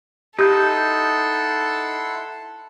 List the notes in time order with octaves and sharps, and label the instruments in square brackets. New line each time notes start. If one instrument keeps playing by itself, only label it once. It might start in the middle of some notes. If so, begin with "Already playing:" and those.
[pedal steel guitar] D#4 G6 [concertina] E4 F#5 C6 [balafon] G4 [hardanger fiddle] A4